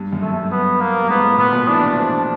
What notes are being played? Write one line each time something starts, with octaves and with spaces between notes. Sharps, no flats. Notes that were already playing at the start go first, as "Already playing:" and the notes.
Already playing: G2
F#2
A3
G2
B3
A#3
G2
G#2 B3
A2
A#2 B3
B2
E3 D4
F3